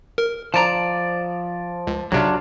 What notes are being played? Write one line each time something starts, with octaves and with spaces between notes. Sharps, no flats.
A#4
F3 D5 A5 A#5
C#2
B1 C3 F#3 D4 F4